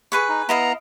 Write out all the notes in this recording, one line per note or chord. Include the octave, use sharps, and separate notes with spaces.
G#4 B4 C#6
D#4
B3 E4 D#5 F5 A#5